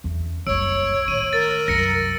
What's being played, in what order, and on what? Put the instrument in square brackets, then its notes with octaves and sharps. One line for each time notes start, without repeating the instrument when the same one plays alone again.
[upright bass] E2 C#3
[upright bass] F#1 C2 [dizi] C#5 [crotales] E6 D7
[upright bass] A2 D#3 [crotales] D#7 F#7
[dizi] A#4 [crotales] A6
[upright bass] C2 F#2 [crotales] A#6 C#7